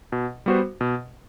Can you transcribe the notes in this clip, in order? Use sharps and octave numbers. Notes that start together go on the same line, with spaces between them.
B2
G3 B3 F#4 C5
B2